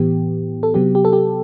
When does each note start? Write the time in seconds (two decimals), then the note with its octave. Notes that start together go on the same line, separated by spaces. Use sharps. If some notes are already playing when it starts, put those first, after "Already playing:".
Already playing: A2 E3 B3 G4
0.63 A4
0.74 C3 F#3 B3 G4
0.95 G4
1.05 A4
1.13 G4